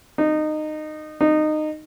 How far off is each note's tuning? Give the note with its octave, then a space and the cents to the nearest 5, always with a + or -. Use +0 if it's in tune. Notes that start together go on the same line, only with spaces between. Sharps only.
D#4 -20
D#4 -20